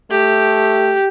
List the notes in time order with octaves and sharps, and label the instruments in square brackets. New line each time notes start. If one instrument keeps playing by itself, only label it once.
[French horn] A3 [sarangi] G4